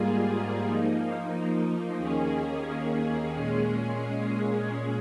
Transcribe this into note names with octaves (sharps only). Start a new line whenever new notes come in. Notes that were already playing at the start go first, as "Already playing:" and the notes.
Already playing: G#2 G3 A#3 F4 G#4
F3 A#3 D#4
D#2 D#3 A#3 C#4 G#4
A#2 G#3 C#4 G#4